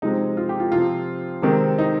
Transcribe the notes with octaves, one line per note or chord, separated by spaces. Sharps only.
C3 F3 G#3 C4 D#4
F4
G4
F4
C3 F3 C4 F4
C3 D#3 G#3 C4
D#4